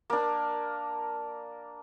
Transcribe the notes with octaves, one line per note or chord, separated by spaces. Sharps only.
A#3 D4